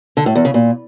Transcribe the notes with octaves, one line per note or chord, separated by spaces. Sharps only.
D3
A2
E2
C#3
A#2